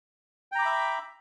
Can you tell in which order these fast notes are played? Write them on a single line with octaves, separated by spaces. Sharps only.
G5 A#5 D6 B5 E5